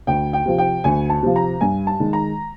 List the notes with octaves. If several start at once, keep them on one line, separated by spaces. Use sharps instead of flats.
D2 G5
G5
C3 F3
G5
D2 G#5
A5
C3 F3
A#5
G2 G#5
A5
D#3 G#3
A#5